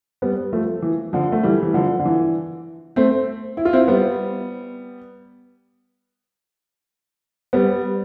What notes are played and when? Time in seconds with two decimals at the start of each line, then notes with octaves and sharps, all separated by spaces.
0.22 G3 B3
0.53 F3 A3
0.82 E3
1.13 D3 F3
1.32 A3
1.43 E3 G3
1.63 E3
1.74 D3 F3
1.99 D3
2.05 E3
2.96 A3 C4
3.57 E4
3.65 F4
3.73 C4 E4
3.88 G3 B3
7.53 G3 B3